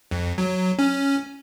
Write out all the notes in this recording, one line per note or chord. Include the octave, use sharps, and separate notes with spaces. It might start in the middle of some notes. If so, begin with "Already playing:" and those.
F2
F#3
C#4